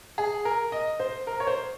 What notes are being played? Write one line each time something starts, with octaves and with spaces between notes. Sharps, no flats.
G#4
A#4
D#5
C5
A#4
C#5
C5